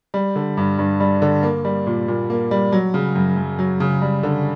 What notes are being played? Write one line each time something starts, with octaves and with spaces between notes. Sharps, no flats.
G3
D3
G2
G2
G3
D3
A#3
G3
A#2
A#2
A#3
G3
F#3
C#3
F#2
F#2
F#3
C#3
G3
D3